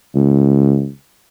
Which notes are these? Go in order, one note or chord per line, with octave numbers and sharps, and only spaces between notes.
C#2